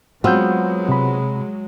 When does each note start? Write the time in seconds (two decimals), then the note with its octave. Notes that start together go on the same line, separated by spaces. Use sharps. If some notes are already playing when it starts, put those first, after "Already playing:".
0.24 F#3 G#3 B3 C4 F4 F#4 E6 G6
0.89 C3 B5